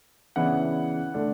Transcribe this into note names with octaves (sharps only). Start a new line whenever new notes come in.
C#3 E3 B3 D4 F#5
D3 A3 D4